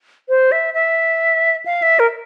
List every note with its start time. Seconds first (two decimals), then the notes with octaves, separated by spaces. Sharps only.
0.29 C5
0.52 E5
0.74 E5
1.66 F5
1.82 E5
1.99 A#4